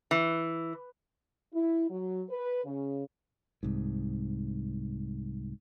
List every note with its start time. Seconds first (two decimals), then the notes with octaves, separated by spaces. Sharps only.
0.11 E3
1.53 E4
1.90 F#3
2.29 B4
2.65 C#3
3.63 C2 G#2